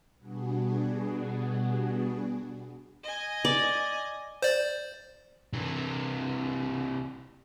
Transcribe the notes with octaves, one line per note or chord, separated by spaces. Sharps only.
B2 G3 B3 D4 F#4 G#4
D#5 G#5
D5
C5 D5
C3 E3